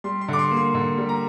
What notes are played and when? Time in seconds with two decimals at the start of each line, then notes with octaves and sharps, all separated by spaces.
0.04 G3 C6
0.21 C6
0.28 D3 D6
0.39 C6
0.51 A#3
0.57 C6
0.74 D3
0.98 G3
1.09 A#5